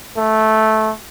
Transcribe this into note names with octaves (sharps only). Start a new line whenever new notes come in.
A3